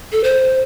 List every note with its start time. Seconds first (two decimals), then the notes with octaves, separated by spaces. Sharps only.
0.12 A4
0.24 C5